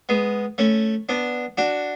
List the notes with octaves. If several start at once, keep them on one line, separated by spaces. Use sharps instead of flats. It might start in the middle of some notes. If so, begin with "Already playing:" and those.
G#3 B3
A3 C#4
B3 D4
D4 F#4